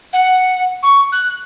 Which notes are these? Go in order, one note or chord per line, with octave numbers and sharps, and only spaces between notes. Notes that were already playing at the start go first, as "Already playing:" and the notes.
F#5
C#6
F#6